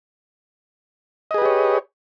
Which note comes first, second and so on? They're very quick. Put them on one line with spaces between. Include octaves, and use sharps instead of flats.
D#5 G#4 B4 G4 C#5